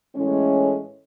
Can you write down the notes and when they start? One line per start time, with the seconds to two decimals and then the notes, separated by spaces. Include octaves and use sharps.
0.15 A2 E3 G#3 C#4